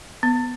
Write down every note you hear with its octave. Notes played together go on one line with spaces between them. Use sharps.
B3